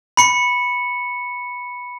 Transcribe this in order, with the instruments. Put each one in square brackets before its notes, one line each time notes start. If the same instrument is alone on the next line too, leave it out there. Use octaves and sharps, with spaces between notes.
[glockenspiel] B5 C#7